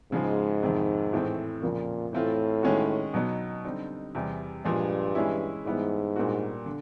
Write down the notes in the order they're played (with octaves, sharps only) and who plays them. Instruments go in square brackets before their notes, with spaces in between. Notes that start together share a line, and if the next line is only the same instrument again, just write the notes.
[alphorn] G#2 [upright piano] C#3 F3 G#3
[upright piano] F2 C3 D#3
A2 E3 A3 C4
[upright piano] F2 C#3 F3 A#3 [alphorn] A#2
[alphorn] A2 [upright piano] E3 A3 C4 F4
[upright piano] D#3 G#3 C#4 F#4
B2 F#3 B3 D#4
D3 G3 C4 D#4
E2 C3 E3 G3
[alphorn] G2 [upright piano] A#2 F3 G#3
[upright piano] E3 G#3 C#4 E4
[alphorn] G#2 [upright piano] E3 G3 B3 E4
[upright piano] A#2 G3 A#3 D4 F#4
D3